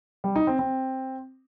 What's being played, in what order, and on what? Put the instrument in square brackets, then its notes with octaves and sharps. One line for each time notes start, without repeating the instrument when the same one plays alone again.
[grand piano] G3
D#4
C4
C4